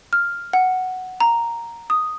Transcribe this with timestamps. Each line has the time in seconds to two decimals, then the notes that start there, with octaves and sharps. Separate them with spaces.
0.13 F6
0.53 F#5
1.20 A#5
1.90 D#6